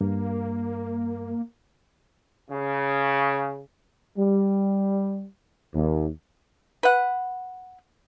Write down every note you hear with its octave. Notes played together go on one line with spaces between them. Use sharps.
G2 A#3
C#3
G3
D#2
B4 F#5